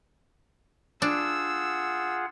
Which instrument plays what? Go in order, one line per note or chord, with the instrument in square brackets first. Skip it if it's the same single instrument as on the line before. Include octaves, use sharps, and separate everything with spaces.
[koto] D4 [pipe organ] F4 G#4 F#5 [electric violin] E6